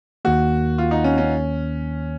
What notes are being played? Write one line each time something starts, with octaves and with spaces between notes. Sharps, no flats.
D#2 D#3 A#3 F#4
F4
D#4
C#4
C#4